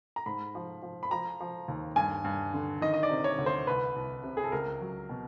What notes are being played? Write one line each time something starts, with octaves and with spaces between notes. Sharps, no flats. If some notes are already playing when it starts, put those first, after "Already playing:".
A#5
G#2 B5
F3
F3
B5
F3 A#5
F3
D#2
G2 G#5
G2
D3
D#3 D#5
D#5
D5
C3
C#5
D2
C5
C2 B4
C2
C3
G#4
A4
C#2 A#4
F#3
B2